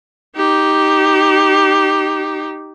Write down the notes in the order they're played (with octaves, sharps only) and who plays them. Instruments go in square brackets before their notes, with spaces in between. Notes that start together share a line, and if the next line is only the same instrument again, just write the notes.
[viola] D#4 G4